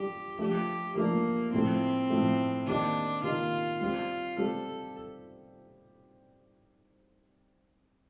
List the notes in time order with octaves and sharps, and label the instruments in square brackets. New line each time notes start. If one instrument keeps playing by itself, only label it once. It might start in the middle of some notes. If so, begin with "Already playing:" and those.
Already playing: [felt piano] G3 D4 F4 [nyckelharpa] G4
[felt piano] F3 A3 D4 [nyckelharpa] G4
[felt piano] F3 A3 D4 [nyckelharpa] A#3
[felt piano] A2 F3 A3 [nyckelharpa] C4
[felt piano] A2 F3 A3
[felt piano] D#3 A#3 D#4 G4 [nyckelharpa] D4
[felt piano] D#3 A#3 D#4 G4 [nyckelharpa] F4
[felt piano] G3 C4 G4 [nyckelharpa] F4
[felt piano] G3 C4 G4 [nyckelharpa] A4